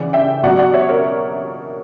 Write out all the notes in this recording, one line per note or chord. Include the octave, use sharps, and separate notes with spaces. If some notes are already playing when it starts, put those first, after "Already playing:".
Already playing: C#3 E3 D5 F#5
E5 G5
B2 F#3 D5 F#5
D5 F#5
C#5 E5
A#4 C#5